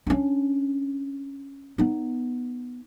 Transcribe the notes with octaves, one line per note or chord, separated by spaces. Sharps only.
C#4 D4
B3 D#4